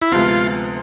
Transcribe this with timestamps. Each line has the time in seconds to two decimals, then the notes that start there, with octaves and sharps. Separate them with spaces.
0.02 E4
0.12 D2 C3 F3 G#3 B3 F4